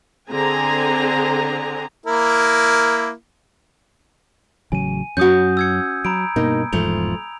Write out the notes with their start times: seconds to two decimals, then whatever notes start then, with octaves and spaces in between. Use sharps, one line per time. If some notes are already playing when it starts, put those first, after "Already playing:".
0.30 D3 C4 G#4 G#5 A#5
2.06 A#3 E4 A#4
4.72 A1 C#3 F#3 G#5 D#7
5.17 F#2 F#3 C#4 F#4 D#6 G6
5.57 E6 G#6 C#7
6.05 F#3 A#5 B5 D7
6.36 G2 B2 A#3 D#4
6.73 E1 E2 G#2 F3 A3 F7